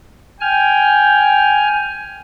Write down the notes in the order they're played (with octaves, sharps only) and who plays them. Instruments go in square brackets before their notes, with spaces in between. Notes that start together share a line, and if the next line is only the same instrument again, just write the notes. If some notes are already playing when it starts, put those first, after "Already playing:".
[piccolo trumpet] G5 [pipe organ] G#5 F6